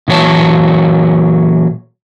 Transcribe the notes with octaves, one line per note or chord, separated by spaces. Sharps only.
A#2 E3 F#3 C#5 A5